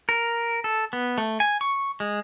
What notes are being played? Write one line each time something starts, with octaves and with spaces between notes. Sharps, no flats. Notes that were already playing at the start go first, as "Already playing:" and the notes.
A#4
A4
B3
A3
G#5
C#6
G#3